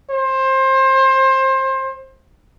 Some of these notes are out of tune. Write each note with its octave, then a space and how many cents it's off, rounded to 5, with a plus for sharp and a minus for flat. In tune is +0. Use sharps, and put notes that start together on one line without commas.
C5 +25